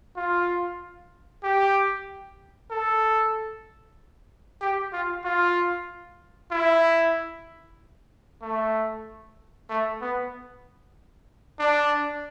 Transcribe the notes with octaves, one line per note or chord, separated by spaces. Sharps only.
F4
G4
A4
G4
F4
F4
E4
A3
A3
B3
D4